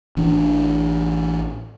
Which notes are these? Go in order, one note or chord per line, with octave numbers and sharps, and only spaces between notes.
A1 E3 D4